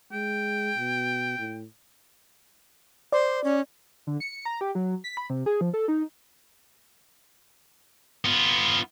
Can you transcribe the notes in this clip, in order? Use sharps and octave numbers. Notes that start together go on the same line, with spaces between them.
G#3 G5
B2
A2
C5 D5
C#4
D3
C#7
A#5
G4
F#3
B6
B5
C3
G#4
F3
A4
D#4
B3 F4